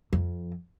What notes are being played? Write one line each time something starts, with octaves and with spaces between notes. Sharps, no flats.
F2